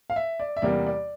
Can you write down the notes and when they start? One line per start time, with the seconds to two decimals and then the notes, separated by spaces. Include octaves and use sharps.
0.10 F5
0.16 E5
0.40 D5
0.56 E5
0.62 E2 C3 G3 A#3 D5
0.87 D5